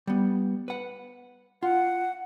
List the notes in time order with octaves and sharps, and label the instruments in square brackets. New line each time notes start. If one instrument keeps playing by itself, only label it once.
[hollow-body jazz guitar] G3 B3
B4 F#5
[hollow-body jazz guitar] F4 [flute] F#5